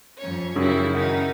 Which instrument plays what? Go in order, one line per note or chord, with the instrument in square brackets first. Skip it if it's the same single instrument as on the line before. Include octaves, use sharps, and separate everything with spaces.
[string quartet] F2 C#4 C#5
[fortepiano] F#2 [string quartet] C#3 G3 E4 [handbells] D#4 F#4 G#4
[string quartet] D#3 D#4 E4 [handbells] C#4 A#4 F#5